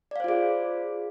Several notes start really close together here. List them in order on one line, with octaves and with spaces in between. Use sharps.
D5 F5 C5 F4 G#4